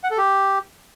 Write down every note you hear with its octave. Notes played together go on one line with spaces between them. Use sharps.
F#5
A4
G4